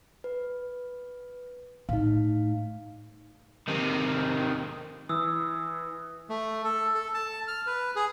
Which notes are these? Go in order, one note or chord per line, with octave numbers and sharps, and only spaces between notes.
B4
A2 D#4 F5
C3 D#3
E3 D#6 E6
A3
A4
A4
A5
F6
B4
G#4